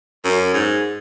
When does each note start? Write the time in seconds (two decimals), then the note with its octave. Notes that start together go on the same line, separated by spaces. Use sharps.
0.24 F#2
0.54 G#2